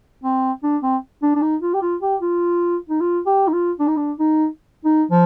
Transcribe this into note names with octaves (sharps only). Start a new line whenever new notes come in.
C4
D4
C4
D4
D4
D#4
F4
G4
F4
G4
F4
D#4
F4
G4
D#4
F4
D4
D#4
D4
D#4
D#4
F3